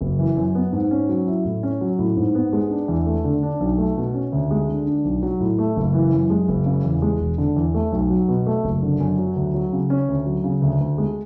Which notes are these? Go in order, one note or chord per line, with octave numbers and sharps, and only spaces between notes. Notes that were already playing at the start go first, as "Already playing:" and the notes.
F#1
E3
F#2
B3
G#2
C#4
F#3
E4
A2
C#4
F#3
A2
G#2
B3
G#3
D4
E2
A3
D3
D4
B1
A3
B2
C#4
D2
G#3
D3
D4
B1
F#3
A2
A3
F#1
E3
F#2
G#3
F#1
C#3
E2
G#3
E1
D3
E2
A3
B1
F#3
B2
A3
F#1
D3
F#2
F#3
D2
F#3
C#3
C#4
D2
F#3
C#3
D2
D2
G#3